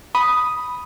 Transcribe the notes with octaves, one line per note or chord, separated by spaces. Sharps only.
B5 D#6